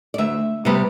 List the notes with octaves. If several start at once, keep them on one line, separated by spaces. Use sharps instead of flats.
D5
D2 E5
C3 G3 B3